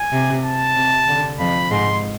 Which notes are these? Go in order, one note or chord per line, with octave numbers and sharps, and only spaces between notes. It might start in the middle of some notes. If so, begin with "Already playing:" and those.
Already playing: G#5
C3
A5
C3
D3
F2 F3 B5
G#2 G#3 C6